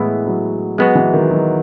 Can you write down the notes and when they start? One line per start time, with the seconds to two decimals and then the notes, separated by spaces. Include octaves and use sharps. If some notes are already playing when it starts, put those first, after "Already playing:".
Already playing: A2 E3 G#3 B3 E4 G#4
0.27 F#3
0.78 F#3 G#3 B3 F#4
0.95 E3
1.13 D#3
1.31 F#3